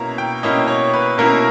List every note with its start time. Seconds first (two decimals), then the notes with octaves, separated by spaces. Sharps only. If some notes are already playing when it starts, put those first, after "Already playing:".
Already playing: B2 A#3 C#4 E4 A#5
0.18 G5
0.43 B2 A#3 C#4 E4 D#5
0.68 C#5
0.93 B4
1.18 B2 A#3 C#4 E4 A#4